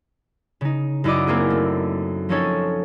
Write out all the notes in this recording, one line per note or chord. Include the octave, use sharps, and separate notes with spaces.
C#3 D#4
F#2 D#4 E4 D5 D#5 D6
A#3 C4 G#4
A3
F3 C4 C#4 D#4 A4 C#5